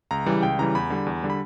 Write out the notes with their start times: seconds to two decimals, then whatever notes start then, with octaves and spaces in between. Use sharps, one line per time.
0.11 C#2 A#5
0.26 C#3 E3 G3
0.43 C#2 G5
0.59 C#3 E3 G3 A#5
0.75 E2 B5
0.90 D3 G3
1.06 E2
1.23 D3 G3
1.30 B5